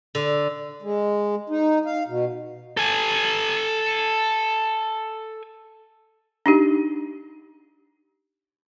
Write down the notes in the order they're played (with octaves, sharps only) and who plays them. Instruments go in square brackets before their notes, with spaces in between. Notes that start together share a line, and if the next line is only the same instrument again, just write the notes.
[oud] D3
[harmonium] G#3
D#4
F5
B2
[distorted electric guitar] A4 G#5
[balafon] D4 D#4 G4